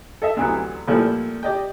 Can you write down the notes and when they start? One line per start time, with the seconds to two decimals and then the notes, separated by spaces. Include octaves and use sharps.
0.22 A4 D#5 E5
0.37 D2 C3 E3 F#3 B3
0.88 A#2 F3 G3 A3 E4
1.43 G4 D5 D#5 G5